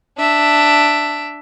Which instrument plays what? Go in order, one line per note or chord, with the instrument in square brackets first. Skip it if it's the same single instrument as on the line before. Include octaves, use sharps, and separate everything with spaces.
[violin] D4 E5